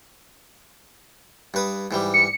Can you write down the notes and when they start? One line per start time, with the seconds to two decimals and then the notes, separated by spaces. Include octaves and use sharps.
1.54 G2 B4 D#6
1.91 G#2 E3 G3
2.14 C#7